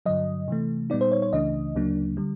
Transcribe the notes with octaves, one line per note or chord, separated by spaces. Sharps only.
G2 D3 F#3 D#5
C3 E3 A3
A#2 G3 B3 D#4 D5
C5
C#5
C#5
C#2 C#3 E3 A3 D4 D#5
D2 C#3 F#3 A#3 D4
D3 G3